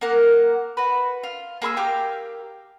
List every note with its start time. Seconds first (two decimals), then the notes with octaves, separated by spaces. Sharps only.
0.01 A#3 A#4 F#5
0.77 F#4 B4
1.23 F4
1.62 A#3 G#4 C6 E6
1.77 G4 A#4 F5 G5